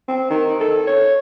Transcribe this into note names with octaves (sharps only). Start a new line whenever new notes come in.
C4
D#3
A4
C#5